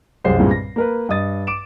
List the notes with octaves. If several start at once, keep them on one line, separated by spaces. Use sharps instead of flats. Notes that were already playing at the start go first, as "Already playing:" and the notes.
C2 F#2 G#3 G4 C5 C7
G2 A#2 C#3 G3 G#3 C4
A#6
A#3 A#4 B4
G2 D#5 D#6 A6
D6 D7 E7